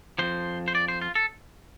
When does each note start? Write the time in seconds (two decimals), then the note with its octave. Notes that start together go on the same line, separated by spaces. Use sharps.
0.18 F2 C3 F3 C5
0.68 C5
0.75 D5
0.88 C5
1.02 F4
1.15 A4